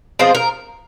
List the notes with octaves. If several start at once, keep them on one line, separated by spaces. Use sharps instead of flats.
F3 G#3 C4 F4 C5
A#4